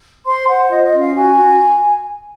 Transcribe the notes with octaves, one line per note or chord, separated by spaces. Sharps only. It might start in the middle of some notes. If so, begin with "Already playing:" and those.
C5 C6
C5 F#5
F4 D#5
D#5
C#4
F5
F#4 G#5
F#4